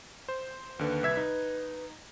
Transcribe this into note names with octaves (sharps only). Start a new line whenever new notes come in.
C5
D#2 D3 B4
C2 E5 G#6
D#4